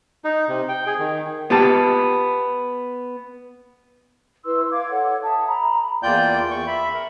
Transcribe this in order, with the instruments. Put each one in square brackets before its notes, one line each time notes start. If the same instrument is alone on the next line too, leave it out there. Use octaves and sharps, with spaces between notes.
[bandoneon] D#4
C3
G5
G#4
D#3
[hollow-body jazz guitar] B3 G4 A5
[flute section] E4 B4 C6 E6
F5 D6 G#6
A4 C#5 F#5
E5 A5 D#6
A#5 B5
[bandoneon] E2 A#3 F4 D5 G5 G6
E2 C#6
E5 B5
A#4